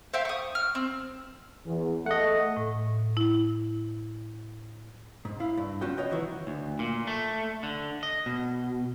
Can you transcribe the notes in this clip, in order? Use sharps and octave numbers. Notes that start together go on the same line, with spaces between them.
C5 E5 F5 G5
C#6 D#6
F6
C4
E2
A3 D#5 F#5
A2
E4
G#2
E4 F5
G2
C#2 C#4 F4 F#4 G5
C#5 D#5 G5
C2 D#3 E3 F#4
D2
A#2
A3
D3
D#5
B2